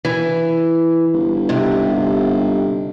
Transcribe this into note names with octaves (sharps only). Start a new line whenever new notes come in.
E3
G1
G#2 C3